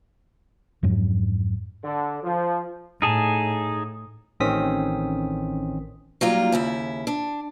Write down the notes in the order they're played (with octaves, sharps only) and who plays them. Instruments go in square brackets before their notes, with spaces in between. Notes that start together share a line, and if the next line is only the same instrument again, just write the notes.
[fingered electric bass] F2 G#2 F#3
[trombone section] D3
F3
[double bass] A2 [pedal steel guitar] D#4 G#4 A5
[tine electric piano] A1 D#3 C4 C#4 D#6 B6
[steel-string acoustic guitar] F#3 G3 A#3 D#4 F4
D#2 C#3 E4
D4